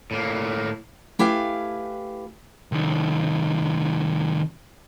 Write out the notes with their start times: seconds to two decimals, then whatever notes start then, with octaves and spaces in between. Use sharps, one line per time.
0.11 A2 A#3
1.19 A3 E4 G4 B4 F5 G#5
2.72 C2 D#3